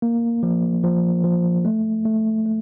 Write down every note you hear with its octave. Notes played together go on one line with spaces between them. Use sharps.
A#3
F3
F3
F3
A3
A3
A3